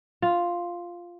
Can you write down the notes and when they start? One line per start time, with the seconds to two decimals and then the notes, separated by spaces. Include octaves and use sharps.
0.22 F4